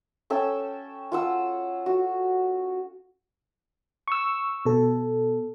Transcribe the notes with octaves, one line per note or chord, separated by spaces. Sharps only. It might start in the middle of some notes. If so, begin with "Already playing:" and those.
C#4 A4 G5 E6
F4 F#5 E6
F#4
C#6 E6
B2 A4